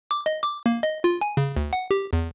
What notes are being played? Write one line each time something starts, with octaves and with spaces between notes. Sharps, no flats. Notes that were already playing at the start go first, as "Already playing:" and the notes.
D6
D#5
D6
A#3
D#5
F4
G#5
C#3
D2
F#5
G4
E2